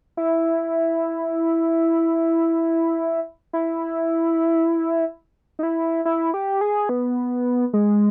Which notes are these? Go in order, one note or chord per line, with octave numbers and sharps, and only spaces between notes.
E4
E4
D#4
E4
E4
G4
G#4
B3
G#3